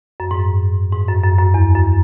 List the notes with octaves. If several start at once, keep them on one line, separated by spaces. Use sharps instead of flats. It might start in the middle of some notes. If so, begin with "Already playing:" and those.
F#2
G#2
G#2
F#2
F#2
F#2
E2
F#2